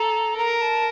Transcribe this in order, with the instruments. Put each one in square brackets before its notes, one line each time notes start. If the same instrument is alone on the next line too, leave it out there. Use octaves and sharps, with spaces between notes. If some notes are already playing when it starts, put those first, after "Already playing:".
Already playing: [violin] A4 [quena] A#5
[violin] A#4 [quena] A#5
[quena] A5